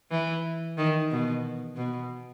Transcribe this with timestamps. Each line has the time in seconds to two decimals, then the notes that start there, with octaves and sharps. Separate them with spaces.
0.11 E3
0.78 D#3
1.11 B2
1.77 B2